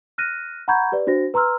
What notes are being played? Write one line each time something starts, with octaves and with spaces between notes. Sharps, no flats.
F6 F#6 A#6 D#7
F#5 A#5 B5 C#6 G6 G#6
G4 B4 D5
D4 F#4 C5 A#6
B4 A#5 C6 E6 F6